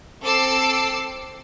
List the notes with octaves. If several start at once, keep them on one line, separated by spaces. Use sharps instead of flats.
C4 A4 D6 E6 C7